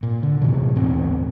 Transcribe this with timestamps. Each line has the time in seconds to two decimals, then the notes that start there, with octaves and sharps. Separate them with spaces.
0.03 A#2
0.23 D3
0.42 A2 C3 E3
0.76 A1 D#2 B2 C4